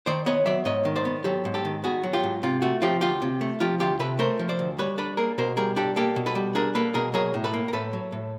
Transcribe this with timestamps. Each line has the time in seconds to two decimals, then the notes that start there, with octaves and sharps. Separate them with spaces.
0.06 D#3 C5 D5
0.26 B3 C#5 D#5
0.46 F#3 D5 E5
0.65 G#2 C#5 D#5
0.85 D#3
0.96 C5 D5
1.05 B3
1.24 F#3 G4 A4
1.45 G#2
1.54 G4 A4
1.65 D#3
1.84 B3 F#4 G#4
2.03 F#3
2.13 F4 G4
2.23 G#2
2.43 C3 F4
2.62 A3 F#4
2.82 F3 F4 G4
3.01 D2 F4 G4
3.22 C3
3.41 A3
3.60 F3 F4 G4
3.80 D2 F4 G4
3.99 C3 A4 B4
4.19 A3 A#4 C5
4.39 F3
4.49 C5 D5
4.59 D2
4.78 G3 B4 C#5
4.98 D4 A4 B4
5.17 A#3 G#4 A#4
5.38 B2 A#4 C5
5.57 G3 G#4 A#4
5.76 D4 G4 A4
5.96 A#3 G4 A4
6.16 B2
6.26 A4 B4
6.35 G3
6.55 D4 G#4 A#4
6.75 A#3 A4 B4
6.94 B2 G#4 A#4
7.14 F#3 G#4 A#4
7.34 A2
7.44 A4 B4
7.54 A#3
7.68 A#4
7.73 A2 A4 B4
7.93 F#3
8.12 A2